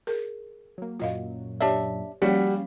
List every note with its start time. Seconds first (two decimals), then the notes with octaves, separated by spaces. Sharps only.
0.07 G#4 A#4
0.78 F#3 A#3
1.00 F#2 A#2 F#3 F4 D#5 F5
1.60 D4 G4 C#5 D5 E5
2.22 F3 G3 A#3 C#4 F#4 F5